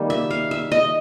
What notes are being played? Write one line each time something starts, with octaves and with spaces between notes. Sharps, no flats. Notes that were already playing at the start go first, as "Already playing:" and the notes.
Already playing: D#3 G3 A#3
E5
F5
E5
D#5